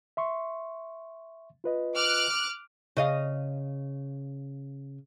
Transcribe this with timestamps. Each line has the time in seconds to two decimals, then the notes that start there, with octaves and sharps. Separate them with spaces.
0.17 E5 C6 C#6
1.64 F4 B4 D#5
1.95 D6 F6 F#6
2.97 C#3 D#5 F5